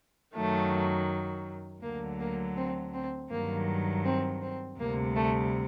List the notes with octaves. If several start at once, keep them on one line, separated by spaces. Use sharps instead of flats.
F#2 D#3 F#3 A3
D2 D3 F#3 A#3
A#3
C4
C4
G2 D#3 F#3 A#3
C4
C4
D2 C3 G3 A#3
A3